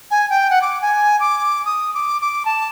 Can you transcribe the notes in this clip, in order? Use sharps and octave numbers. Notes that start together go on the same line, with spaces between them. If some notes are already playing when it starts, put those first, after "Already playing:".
G#5
G5
F#5
D6
G#5
D6
D#6
D6
D6
A5